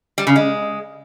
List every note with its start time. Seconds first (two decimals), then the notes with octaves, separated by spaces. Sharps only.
0.18 G3
0.27 C#3
0.36 G#3